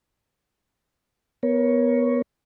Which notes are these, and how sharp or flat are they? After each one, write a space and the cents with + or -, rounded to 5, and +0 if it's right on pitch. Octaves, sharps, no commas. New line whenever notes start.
B3 +0 A#4 +25 C#5 +0